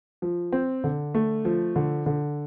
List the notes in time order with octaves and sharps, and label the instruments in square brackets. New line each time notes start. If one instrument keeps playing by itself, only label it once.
[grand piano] F3
C4
D3
A3
F3
D3
D3